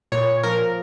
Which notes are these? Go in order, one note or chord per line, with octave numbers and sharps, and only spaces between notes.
A#2 C#5
F3 A#4